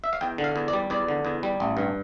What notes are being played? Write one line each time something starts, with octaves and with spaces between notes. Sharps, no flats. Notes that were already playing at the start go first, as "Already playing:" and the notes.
E5
F5
E2 G5
D3
F5
E2
D5
G3
E2 D5
D3
E2
G3
A1
G2